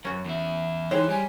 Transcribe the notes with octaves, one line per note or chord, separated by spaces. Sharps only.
F#2 C#4 F#4
E2 E4
E3 G#3 D#4 G4 C5 C#5
G3 G#5